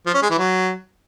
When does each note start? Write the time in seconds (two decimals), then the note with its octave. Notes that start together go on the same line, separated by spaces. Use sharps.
0.06 F3
0.14 C#4
0.22 G#3
0.30 E3
0.38 F#3